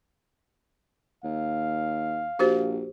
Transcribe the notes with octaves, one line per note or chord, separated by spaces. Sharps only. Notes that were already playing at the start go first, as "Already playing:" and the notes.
D#2 F5
A#1 F#4 G4 C5